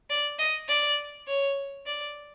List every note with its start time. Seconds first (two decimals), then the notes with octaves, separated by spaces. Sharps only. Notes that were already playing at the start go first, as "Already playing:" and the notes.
0.10 D5
0.39 D#5
0.68 D5
1.27 C#5
1.86 D5